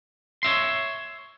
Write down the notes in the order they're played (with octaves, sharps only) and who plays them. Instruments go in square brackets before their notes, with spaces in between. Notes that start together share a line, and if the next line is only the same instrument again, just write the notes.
[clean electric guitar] C#5 D#5 E5 C6